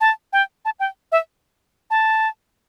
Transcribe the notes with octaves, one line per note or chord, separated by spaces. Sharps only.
A5
G5
A5
G5
E5
A5